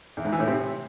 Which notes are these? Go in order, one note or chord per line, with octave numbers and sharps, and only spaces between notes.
E2
G#2
E3
A2
C3